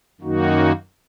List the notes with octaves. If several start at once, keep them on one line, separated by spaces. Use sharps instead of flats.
F#2 D#3 A#3 D#4 F#4